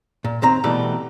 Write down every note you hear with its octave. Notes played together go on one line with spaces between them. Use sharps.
A#2
D#2 C4 A#5
B2 E3 G3 A3